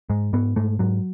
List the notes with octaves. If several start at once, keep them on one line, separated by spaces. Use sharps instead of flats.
G#2 G#3
G#2 B3
G#2 A3
G#2 F#3